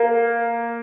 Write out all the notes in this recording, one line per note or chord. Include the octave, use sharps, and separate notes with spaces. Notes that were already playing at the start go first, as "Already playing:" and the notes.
Already playing: A#3